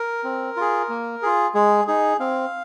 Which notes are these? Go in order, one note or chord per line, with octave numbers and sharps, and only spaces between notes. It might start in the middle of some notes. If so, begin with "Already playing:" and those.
Already playing: A#4
C4
F4 G#4
A#3
F4 G#4
G#3 G#4
D#4 G#4
C4 F5